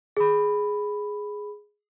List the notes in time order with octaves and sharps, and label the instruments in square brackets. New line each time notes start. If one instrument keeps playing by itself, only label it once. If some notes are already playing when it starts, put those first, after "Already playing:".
[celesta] G#4 B5